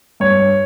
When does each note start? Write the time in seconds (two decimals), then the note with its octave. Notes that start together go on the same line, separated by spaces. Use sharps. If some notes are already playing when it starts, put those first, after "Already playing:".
0.20 G2 C#5